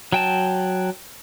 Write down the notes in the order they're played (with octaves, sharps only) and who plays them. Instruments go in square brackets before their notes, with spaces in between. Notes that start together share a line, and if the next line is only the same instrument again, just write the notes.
[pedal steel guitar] F#3 G5 A5